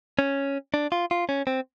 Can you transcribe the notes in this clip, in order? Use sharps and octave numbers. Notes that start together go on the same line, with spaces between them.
C#4
D4
F4
F4
C#4
C4